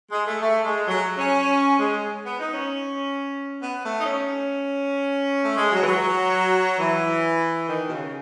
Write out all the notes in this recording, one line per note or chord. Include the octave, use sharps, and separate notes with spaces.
G#3
A3
A3
G#3
F#3
C#4
G#3
B3
D#4
C#4
B3
A3
D#4
C#4
A3
G#3
F#3
E3
F#3
E3
D#3
B2
C#3